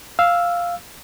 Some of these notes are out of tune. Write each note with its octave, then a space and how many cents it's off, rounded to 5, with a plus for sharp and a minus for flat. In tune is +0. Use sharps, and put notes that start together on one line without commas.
F5 +0 E6 +0